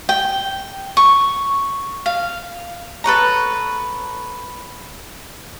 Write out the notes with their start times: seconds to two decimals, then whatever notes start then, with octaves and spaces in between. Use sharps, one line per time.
0.09 G5
0.97 C#6
2.06 F5
3.04 A4 B4 C#5 A#5